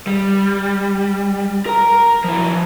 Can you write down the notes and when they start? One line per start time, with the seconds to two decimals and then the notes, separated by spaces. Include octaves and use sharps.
0.07 G3
1.66 A#4 A#5
2.24 F3 E4